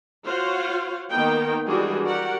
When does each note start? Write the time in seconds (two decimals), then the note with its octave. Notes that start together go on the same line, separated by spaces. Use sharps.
0.24 F4 F#4 C5 C#5 F5 F#5
1.11 D#3 A#3 B3 D#4 G5
1.68 E3 G3 G#3 D4 F#4 G#4
2.07 F#4 G4 A#4 D5 F#5